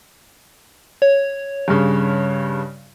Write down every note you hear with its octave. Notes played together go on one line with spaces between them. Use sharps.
C#5
G2 C#3